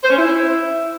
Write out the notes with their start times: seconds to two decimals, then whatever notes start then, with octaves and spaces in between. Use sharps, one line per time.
0.03 C5
0.10 C#4
0.17 E4